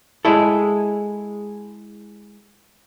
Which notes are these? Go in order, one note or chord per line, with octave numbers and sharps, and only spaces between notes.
G#3 E4 A4